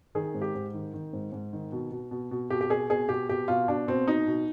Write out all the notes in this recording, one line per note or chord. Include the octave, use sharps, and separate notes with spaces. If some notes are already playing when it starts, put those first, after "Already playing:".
D#3 G#4
G#2
G4
G#2
D#3
D#3
G#2
G#2
D#3
B2
B2
B2
B2
B2 G4
G4
B2 G#4
B2 G#4
B2 G4
B2 G4
B2 F4
B2 D4
B2 C4
B2 D#4
B2